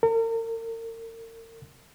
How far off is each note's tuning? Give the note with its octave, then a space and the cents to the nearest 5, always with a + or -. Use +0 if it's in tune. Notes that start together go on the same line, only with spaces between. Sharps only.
A#4 -40